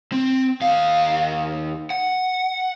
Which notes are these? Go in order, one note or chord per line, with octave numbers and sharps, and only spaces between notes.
C4
D#2 F5
F#5